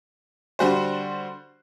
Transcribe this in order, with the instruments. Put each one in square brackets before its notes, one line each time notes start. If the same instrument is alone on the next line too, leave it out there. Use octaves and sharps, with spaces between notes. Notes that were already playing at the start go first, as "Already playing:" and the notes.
[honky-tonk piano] D3 G3 F#4 C5